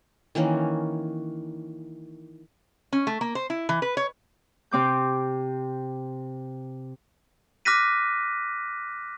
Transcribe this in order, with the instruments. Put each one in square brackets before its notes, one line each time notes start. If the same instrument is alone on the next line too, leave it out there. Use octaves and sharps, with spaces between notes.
[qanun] D#3 E3 A#3 C#4
[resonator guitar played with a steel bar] C#4
A3
A#3
C5
E4
E3
B4
C#5
[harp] C3 C4 D6 G6
[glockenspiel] D6 F6 F#6 A#6 B6 D#7